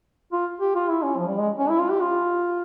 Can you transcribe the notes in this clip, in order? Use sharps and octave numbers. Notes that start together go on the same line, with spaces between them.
F4
G4
F4
E4
C#4
F3
G3
G#3
C#4
E4
F4
G4
F4